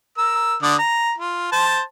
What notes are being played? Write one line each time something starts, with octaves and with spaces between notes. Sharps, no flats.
A#4 E6
D3 D5 D#6
A#5
F4
C5 A5